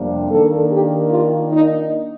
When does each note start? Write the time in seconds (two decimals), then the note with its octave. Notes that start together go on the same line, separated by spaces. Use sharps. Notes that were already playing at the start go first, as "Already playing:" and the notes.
Already playing: F2 C3 G3 A#3 D4
0.30 D#3 A#3 D4 A4
0.71 G4
1.10 F4
1.51 D#4